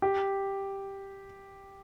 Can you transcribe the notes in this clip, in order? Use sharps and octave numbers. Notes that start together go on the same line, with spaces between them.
G4